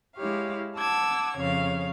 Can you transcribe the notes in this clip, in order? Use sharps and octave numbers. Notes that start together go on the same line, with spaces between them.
G#3 E4 G4 C#5 F5
F#5 A5 D6 E6 G#6
F2 C#3 C#5 F5